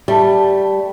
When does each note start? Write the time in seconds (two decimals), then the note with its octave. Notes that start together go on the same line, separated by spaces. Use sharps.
0.08 G3 A3